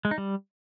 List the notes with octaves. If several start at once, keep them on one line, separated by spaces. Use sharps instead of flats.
G#3
D#4
G3